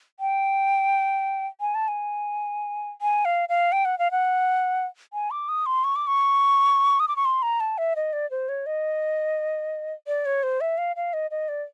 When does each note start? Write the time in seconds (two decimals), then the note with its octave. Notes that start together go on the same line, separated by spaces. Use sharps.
0.20 G5
1.61 G#5
1.75 A5
1.88 G#5
3.02 G#5
3.25 F5
3.49 F5
3.72 G5
3.85 F#5
3.99 F5
4.11 F#5
5.13 G#5
5.31 D6
5.49 D#6
5.66 C6
5.84 C#6
5.96 D6
6.07 C#6
7.00 D#6
7.08 D6
7.16 C#6
7.25 C6
7.42 A#5
7.60 A5
7.78 E5
7.96 D#5
8.13 D5
8.31 C5
8.49 C#5
8.66 D#5
10.07 D5
10.26 C#5
10.43 C5
10.61 E5
10.78 F5
10.96 F5
11.13 D#5
11.31 D#5
11.49 D5